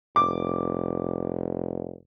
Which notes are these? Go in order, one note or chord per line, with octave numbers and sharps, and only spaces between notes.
F1 D6